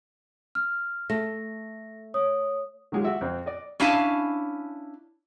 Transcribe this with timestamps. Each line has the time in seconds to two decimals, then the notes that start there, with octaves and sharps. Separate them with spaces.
0.55 F6
1.10 A3 A#6
2.14 C#5 D#6
2.92 D#3 F#3 G#3 F4 G4
3.04 F#4 E5
3.21 F2 C4
3.46 D5 D#5
3.80 C#4 D4 E4 F5 G#5 A5